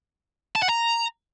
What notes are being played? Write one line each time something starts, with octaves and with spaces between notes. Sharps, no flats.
A5
F#5
A#5